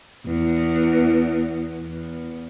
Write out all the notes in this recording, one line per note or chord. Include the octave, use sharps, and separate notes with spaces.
E2
E2